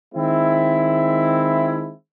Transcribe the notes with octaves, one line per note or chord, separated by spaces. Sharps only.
D#3 G#3 C4 E4